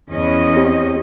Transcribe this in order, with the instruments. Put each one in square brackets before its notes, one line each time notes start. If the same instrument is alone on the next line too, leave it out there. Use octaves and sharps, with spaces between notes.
[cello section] E2 C#4 D#5
[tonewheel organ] C4 G4